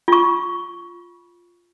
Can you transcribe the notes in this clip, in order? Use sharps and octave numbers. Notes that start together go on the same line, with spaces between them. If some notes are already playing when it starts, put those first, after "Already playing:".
F4 C#6